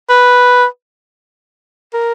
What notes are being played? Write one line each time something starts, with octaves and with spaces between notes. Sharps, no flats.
B4
A#4